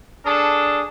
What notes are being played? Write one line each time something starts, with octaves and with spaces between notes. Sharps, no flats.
D4 G#4 A4